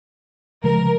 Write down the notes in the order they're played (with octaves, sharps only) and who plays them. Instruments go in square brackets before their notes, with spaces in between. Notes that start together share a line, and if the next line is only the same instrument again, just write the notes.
[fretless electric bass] C#3 F3 G#3 [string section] A#4